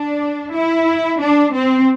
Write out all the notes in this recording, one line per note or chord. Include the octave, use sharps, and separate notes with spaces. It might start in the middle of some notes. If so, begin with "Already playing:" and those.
Already playing: D4
E4
D4
C4